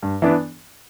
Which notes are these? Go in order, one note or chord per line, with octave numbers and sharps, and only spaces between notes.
G2
E3 B3 D4